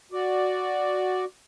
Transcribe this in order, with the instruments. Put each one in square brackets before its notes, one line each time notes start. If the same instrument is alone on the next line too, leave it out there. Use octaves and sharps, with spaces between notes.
[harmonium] F#4 D5